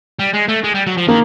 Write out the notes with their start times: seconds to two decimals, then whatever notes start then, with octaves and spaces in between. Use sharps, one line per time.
0.19 G3
0.34 G#3
0.49 A3
0.64 G#3
0.75 G3
0.87 F#3
0.98 F3
1.08 D#3 A#3